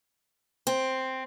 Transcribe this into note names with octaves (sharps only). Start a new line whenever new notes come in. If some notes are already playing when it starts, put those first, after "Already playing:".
C4